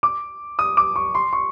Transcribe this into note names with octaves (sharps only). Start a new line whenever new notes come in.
D6
D#6
D6
C#6
C6
C#6